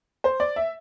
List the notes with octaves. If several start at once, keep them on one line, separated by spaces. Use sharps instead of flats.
C5
D5
E5